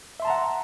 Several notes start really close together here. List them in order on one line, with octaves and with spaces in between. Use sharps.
E5 C6 A5 A#5 F#5